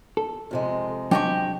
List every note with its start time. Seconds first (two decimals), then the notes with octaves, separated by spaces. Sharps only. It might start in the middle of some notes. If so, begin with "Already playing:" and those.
0.17 A4
0.51 F2 C3 G#3
1.11 F#3 D4 G4 D#5 G#5 C#6